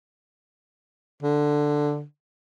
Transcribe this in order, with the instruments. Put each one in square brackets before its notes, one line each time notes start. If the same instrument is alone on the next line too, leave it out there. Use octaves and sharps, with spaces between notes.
[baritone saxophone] D3